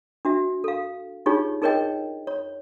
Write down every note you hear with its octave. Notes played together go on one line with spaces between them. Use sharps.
D4 F#4 E5
A4 F5
D4 D#4 F4 G4 G#4 C#5
D#4 G#4 A#4 C#5 D#5 G5
C#5